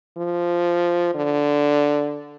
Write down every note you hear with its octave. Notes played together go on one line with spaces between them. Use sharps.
F3
D3